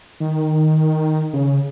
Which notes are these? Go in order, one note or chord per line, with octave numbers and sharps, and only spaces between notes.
D#3
C#3